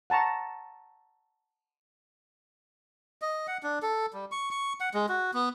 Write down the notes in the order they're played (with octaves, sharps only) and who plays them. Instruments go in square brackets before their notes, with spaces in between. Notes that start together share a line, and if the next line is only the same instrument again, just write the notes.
[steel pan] F#5 A5 A#5 C#6
[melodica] D#5
F#5
D4
A4
G3
C#6
C#6
F#5
G#3
F#4
B3